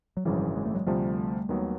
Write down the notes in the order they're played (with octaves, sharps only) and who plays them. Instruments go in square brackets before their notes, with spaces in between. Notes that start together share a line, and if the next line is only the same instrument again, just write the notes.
[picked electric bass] F#3
[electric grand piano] G#1 F#2 C#3 E3 [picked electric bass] F3 G3
[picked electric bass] G#3
A3
F#3 G#3
[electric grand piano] D2 C3 F3 [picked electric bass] G3 A3
[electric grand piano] D#2 D#3 F#3 B3